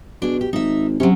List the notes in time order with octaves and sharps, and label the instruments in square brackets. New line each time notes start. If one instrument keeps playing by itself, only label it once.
[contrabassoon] B2 [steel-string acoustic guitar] D4 G#4
[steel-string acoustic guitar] G4
[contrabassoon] G#1 [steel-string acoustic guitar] D#4 E5
[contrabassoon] C3 [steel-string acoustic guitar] F#3 C#4